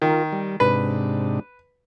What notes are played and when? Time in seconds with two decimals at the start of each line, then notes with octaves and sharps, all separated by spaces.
0.02 D#3 F4 A#4
0.32 G3
0.60 G#2 C3 D4 B4